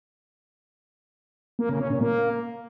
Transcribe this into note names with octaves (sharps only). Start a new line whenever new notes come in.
A#3
C#3
C#4
A#2
A#3